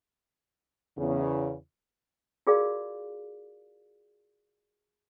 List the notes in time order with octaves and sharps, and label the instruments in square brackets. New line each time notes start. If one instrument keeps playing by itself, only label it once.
[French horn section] E2 C#3
[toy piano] F4 F#4 G#4 A#4 D5 F5